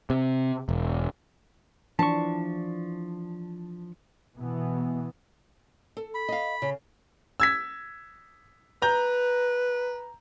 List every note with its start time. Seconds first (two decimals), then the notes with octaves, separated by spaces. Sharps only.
0.10 C3
0.69 E1
1.99 E3 F3 D4 A5 C#6
4.37 B2 E3 B3
5.97 A4
6.15 B5
6.29 D#5 F5
6.62 C#3
7.40 E6 G#6 B6
8.82 B4 A#5 G6